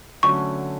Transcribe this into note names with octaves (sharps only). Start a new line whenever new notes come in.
D3 F#3 A3 C#4 F#4 C#6